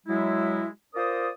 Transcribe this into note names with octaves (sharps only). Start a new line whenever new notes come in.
F#3 G#3 E4
F4 A#4 C5 D5 D#6